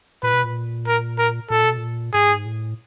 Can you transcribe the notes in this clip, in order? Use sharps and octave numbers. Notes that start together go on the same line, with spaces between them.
A#2 B4
B2
A#2
A#4
A#4
A#2 A4
B2
A#2
G#2 G#4
A2